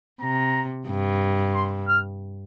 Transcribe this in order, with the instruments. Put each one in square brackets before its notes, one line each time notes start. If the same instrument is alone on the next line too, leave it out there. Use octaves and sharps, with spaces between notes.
[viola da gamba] C3 [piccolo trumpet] A#5
[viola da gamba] G2
[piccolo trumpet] C6
F6